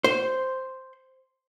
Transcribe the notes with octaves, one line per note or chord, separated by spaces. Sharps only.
C5